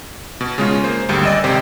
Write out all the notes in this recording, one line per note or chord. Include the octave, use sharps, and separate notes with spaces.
B2
C#3 G#3 C#4 F4
A#3 C5
G#1 D2 G3
D5 D#5 E6
G#1 C3 G4 C5